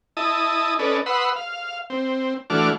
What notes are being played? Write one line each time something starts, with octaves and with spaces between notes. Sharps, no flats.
E4 D#5 A5 D#6
C#4 A4 B4 D5 D#5
B4 F#5 B5 C6 D#6 E6
F5
C4
E3 A3 D4 F#4 D6 F6